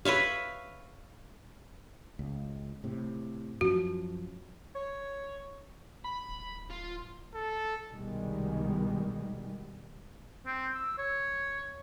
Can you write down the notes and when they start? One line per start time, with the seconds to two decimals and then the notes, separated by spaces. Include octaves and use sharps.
0.05 B4 C#5 E5 F5
2.19 C#2
2.84 A2 C3
3.61 F#2 F3 C#4 F#4
4.75 C#5
6.04 B5
6.29 D1
6.71 F4
7.34 A4
7.91 C2 B2 D#3 G3 G#3
10.47 C4
10.75 E6
10.98 C#5